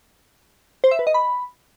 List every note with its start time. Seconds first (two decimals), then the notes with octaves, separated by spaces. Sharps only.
0.84 C5
0.91 E5
0.99 B4
1.07 D#5
1.14 B5